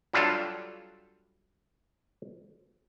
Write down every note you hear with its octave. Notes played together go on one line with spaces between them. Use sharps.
F#3 G3 D4 F4 A4